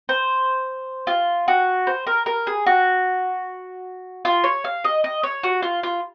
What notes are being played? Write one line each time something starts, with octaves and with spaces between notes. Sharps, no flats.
C5
F4
F#4
C5
A#4
A#4
G#4
F#4
F4
C#5
F5
D#5
D#5
C#5
F#4
F4
F4